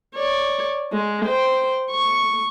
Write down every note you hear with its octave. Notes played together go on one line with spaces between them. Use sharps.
C#5 D5
G#3
C5 G5
C#6